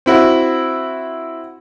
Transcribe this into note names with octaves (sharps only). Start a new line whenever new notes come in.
C4 E4 F#4